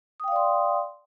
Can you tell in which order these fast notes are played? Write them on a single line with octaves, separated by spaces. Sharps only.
D#6 G5 F5 D5 C6